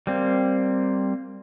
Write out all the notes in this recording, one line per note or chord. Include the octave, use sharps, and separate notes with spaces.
G3 A#3 C4